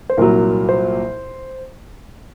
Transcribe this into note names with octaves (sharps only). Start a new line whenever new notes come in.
C5
C2 A#2 F#3 A#4
C5